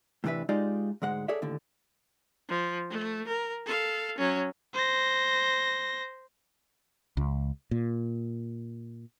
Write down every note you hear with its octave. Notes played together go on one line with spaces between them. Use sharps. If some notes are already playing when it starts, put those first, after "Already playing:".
A2 C3 E3 D4 B4 E5
G#3 D#4 F4 G4 D5 D#5
D2 G#2 G#3 F#5
G#4 A4 C#5 D5 E5
D#2 A2 D3
F3
A3
A#4
A4 F5
F#3 C#4
C5 A#6
C#2
A#2